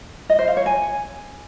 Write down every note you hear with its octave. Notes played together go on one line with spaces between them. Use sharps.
D#5
C5
F5
C#5
G#5